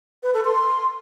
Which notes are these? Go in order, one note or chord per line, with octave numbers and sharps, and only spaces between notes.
B4
A4
C6